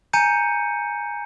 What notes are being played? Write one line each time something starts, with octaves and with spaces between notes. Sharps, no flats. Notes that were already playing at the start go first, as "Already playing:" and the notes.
G#5 A#5 G6 C#7 D#7